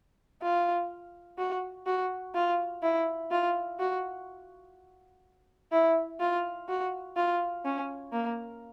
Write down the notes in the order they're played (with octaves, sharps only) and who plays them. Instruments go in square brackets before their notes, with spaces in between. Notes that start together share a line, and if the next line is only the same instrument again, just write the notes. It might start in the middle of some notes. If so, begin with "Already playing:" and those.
[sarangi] F4
F#4
F#4
F4
E4
F4
F#4
E4
F4
F#4
F4
C#4
A#3